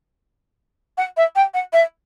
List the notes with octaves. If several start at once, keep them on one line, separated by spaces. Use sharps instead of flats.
F#5
E5
G5
F#5
E5